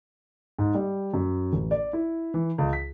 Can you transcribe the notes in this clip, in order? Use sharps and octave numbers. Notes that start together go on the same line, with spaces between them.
G#2
G3
F#2
A1
D5
E4
E3
C#2
B6